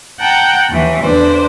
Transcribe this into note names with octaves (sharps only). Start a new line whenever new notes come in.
F#5 G5 A5 A#5
D#2 E3
E2 D3 D4 B4 C5